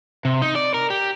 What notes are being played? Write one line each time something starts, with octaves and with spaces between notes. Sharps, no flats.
C3
D#4
D5
A#4
G4